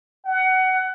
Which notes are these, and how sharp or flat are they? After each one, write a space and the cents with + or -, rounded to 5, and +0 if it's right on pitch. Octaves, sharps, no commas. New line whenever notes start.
F#5 +20